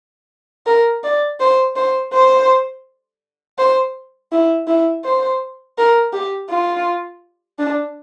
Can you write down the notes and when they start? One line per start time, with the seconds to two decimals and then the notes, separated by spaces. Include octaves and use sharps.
0.66 A#4
1.03 D5
1.40 C5
1.76 C5
2.13 C5
3.58 C5
4.32 E4
4.67 E4
5.04 C5
5.78 A#4
6.13 G4
6.50 F4
7.59 D4